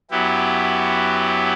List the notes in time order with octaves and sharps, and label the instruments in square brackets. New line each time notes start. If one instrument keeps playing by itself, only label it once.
[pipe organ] F#2 F#3 B3 E4 G4